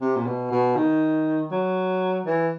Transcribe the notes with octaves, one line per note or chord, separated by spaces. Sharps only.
C3
A#2
B2
B2
D#3
F#3
E3